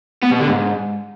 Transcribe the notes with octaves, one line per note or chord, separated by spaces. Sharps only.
B3
B2
D3
G#2